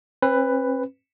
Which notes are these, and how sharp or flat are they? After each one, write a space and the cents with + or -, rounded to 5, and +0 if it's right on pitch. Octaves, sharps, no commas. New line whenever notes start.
C4 +45 B4 +10